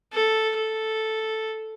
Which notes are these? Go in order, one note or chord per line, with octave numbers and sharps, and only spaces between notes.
A4
A4